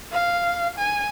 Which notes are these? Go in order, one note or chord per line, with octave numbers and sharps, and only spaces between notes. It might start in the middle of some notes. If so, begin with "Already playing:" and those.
F5
G#5